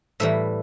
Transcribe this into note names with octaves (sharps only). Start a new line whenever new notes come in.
A2 E3 G3 E5